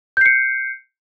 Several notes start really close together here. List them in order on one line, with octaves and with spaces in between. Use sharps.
G6 C7 C#7